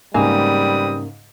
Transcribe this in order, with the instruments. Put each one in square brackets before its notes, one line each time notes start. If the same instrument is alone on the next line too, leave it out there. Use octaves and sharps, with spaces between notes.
[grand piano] G#2 C#3 [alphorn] G3 [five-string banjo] G#3 A#3 [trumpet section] C4 B4 D#6